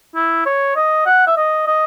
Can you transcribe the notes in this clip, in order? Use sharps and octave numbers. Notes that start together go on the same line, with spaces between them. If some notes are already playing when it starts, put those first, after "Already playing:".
E4
C#5
D#5
F#5
E5
D#5
D#5